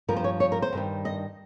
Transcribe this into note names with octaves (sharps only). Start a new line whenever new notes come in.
G2 F3 A#4
C5
C#5
C#5
A#4
C5
G2 D#3 G3
D#5